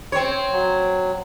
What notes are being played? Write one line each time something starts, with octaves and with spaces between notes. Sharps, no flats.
C4 C#5
F#3